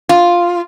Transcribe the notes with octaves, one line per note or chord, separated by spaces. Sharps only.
F4